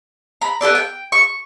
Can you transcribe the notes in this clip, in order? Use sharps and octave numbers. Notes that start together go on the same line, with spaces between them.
A#5 B5
B3 G4 A4 D5
G5
C#6